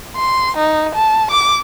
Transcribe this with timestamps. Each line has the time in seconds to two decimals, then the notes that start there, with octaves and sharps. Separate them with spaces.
0.16 C6
0.57 D#4
0.96 A5
1.31 D6